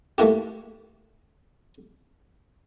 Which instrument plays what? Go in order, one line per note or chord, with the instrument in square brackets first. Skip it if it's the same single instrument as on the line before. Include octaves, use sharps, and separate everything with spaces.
[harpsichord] A3 A#3 E4 G4